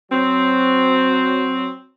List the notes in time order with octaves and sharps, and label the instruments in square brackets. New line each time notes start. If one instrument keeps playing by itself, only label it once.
[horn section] F#3 C4